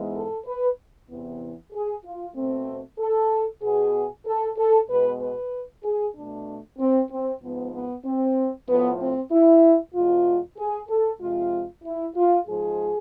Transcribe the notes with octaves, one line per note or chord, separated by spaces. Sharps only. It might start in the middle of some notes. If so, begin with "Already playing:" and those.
Already playing: G#2 E3 G#3 B3
A4
B4
E2 C3 E3 B3
G#4
F4
B2 A3 C4
A4
B2 B3 G#4
A4
A4
B2 G#3 B3 B4
B4
G#4
B2 A3 D4
C4
C4
G#2 F3 B3
B3
C4
A2 F3 A3 B3
C4
E4
E2 B2 G#3 F4
G#4
A4
F2 C3 G#3 F4
E4
F4
G#2 F3 G#3 G#4